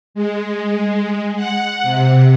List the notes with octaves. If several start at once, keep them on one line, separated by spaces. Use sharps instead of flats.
G#3
F#5
C3